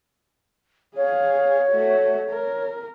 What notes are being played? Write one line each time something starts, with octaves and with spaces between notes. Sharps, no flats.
G#4 C#5 F5
A3 F#4
A#4